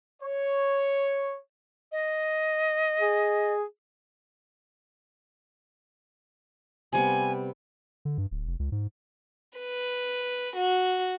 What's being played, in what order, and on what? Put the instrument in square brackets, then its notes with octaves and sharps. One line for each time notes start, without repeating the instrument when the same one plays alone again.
[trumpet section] C#5
[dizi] D#5
[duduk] G#4
[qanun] C3 G3 B3 [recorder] G#5
[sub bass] D3
G2
D1
F1
C#2
G#2
[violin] B4
F#4